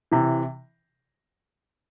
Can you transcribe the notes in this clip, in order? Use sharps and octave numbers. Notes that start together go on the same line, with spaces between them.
C3 E3